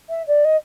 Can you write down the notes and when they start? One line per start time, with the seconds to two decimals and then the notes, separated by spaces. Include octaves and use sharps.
0.09 E5
0.27 D5
0.45 D#5